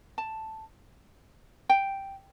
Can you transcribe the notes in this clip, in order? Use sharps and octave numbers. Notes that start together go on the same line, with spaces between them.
A5
G5